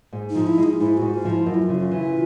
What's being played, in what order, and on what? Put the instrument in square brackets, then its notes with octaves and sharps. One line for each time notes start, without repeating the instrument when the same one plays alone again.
[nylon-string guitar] G#2
[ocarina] D#4
[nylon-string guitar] F3
[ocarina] E4
[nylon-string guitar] G#3
[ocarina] D#4
F4
[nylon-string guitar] G#2 [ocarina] E4
[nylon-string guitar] G#2 [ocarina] F#4
[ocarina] F4
[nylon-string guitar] F3 [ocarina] E4
[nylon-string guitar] F#2 [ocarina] F4
[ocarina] E4
F4
[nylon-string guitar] C#3
[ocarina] F#4
F4
[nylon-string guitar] E3